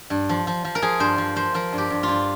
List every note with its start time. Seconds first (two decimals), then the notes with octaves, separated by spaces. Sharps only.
0.10 G2
0.29 F3
0.47 F3
0.65 F3
0.75 A#4
0.82 F3 G#4
1.00 G2 C5
1.18 F3
1.36 F3 C5
1.54 F3 A#4
1.73 G2
1.78 G4
1.90 G2
2.03 G2 F4